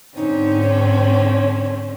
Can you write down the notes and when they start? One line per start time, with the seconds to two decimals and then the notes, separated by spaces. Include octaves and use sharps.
0.17 G#2 D3 C4 C#4 D#4
0.62 C#5